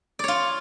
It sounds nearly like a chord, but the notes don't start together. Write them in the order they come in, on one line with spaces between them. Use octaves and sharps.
D5 C#5 F4